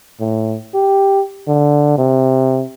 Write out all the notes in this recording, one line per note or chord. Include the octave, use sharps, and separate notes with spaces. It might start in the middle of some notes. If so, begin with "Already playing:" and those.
A2
G4
D3
C3